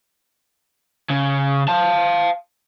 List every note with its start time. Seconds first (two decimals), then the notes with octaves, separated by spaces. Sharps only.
1.10 C#3
1.68 F5 A5